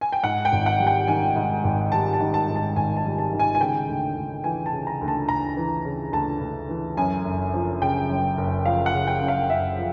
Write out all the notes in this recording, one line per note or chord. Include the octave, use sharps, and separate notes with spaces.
G#5
G5
G#2 F#5
G5
G#1
F#5
G3
G5
D#3 G#5
G#2
G#1
G3 A5
A5
D#3
A5
G#2
A5
G#1 G#5
A5
G3
A5
D#3
G#5
G#5
C#3 G5
D2
D2
E3 G#5
A5
C#3
A#5
D2
A5
D2 A#5
E3
C#3
D2 A5
D2
E3
F#2 G#5
F#1
F3
C#3 G5
F#2
F#1
F3 F5
F#5
C#3
G5
F#2
F5
F#1 E5
F3